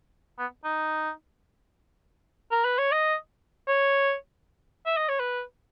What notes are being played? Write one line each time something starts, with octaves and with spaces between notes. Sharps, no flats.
B3
D#4
A#4
B4
C#5
D#5
C#5
E5
D#5
C#5
B4